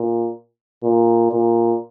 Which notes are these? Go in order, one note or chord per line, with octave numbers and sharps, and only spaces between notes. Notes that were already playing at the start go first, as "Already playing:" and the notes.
Already playing: A#2
A#2
A#2